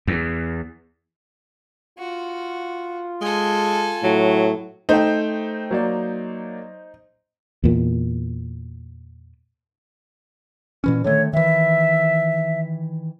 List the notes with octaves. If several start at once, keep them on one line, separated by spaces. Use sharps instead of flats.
E2
F4 F#4
G#3 A4 G#5
A2 F#3
A3 D#4 C5 G5
F#3 A#3 D5
E2 A#2
A#2 E3 C#4
D3 D#3 A3 C#5
D#3 E3 E5